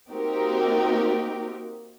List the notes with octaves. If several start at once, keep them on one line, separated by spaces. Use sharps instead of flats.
A#3 C4 D#4 F#4 G4 A#4